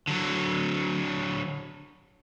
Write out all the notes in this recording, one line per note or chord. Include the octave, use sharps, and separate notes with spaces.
D3 F#3